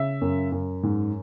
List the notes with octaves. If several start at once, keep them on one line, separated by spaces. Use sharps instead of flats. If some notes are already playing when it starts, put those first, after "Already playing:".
Already playing: C#3 E5
F#2
F#2
G#2